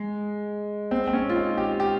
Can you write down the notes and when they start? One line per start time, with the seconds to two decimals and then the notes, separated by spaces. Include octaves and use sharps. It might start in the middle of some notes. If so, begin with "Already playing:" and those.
Already playing: G#3
0.91 C4
1.07 C4
1.13 C#4
1.29 F4
1.36 D#4
1.57 G4
1.80 G4